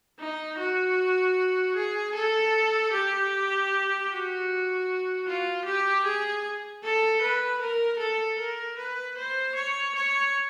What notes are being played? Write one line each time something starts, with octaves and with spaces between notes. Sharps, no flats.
D#4
F#4
G#4
A4
G4
F#4
F4
G4
G#4
A4
B4
A#4
A4
A#4
B4
C5
C#5
C#5